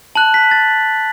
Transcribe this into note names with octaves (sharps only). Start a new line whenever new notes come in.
A5 F#6 F#7
B6
A6